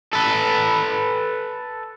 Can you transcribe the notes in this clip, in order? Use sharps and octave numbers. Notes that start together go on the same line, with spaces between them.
A4 B4